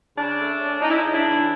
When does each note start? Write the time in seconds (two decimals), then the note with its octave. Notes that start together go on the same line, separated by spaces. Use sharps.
0.17 C#3 D4
0.39 A3
0.60 C#4
0.82 C#4 D#4
0.90 E4
0.99 D#4
1.04 C#3
1.14 D4 E4
1.26 E3